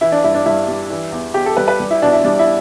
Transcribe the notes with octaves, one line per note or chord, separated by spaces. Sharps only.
E3 E4
D4
G2 E4
D4
G2 E4
G3
E3
E2
E2 G4
A4
G3 B4
B4
G3
E4
B2 D4
E4
G3 D4
E4